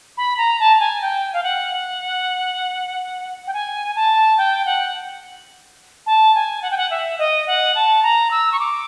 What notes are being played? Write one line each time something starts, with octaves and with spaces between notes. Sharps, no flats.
B5
A#5
A5
A5
G#5
G5
F5
F#5
G5
G#5
A5
G5
F#5
A5
G#5
F#5
G5
F#5
E5
D#5
F#5
A5
A#5
E6
C#6
D6